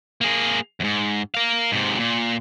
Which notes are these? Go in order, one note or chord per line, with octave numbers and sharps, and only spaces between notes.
A#3 G#4
E2 G#2
A#4 F5
G#2 C3
A#2